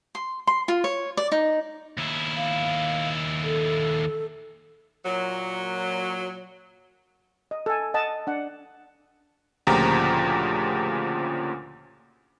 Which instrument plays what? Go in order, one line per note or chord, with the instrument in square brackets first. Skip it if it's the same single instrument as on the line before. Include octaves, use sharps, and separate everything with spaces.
[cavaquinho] C6
C6
F4
C#5
D5
D#4
[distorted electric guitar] D#2 E4
[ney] F5
A4
[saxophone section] A#2 F#3
[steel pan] D#5
A4 G#5
D#5 F#5 A5
D4 F#5
[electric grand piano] D2 A#2 C#3 F3 G4 A#5